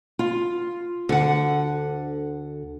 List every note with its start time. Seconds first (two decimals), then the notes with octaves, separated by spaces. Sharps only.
0.19 F4
1.09 D2 D3 F#5